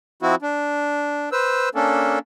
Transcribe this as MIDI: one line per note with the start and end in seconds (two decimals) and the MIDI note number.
0.22 0.35 53
0.22 0.35 60
0.22 0.35 64
0.22 0.35 66
0.42 1.29 62
1.32 1.69 71
1.32 1.69 72
1.32 1.69 88
1.75 2.19 58
1.75 2.19 61
1.75 2.19 62
1.75 2.19 69